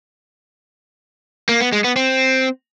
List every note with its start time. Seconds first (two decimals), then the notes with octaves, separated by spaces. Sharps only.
1.49 A#3
1.61 B3
1.72 G#3
1.84 B3
1.96 C4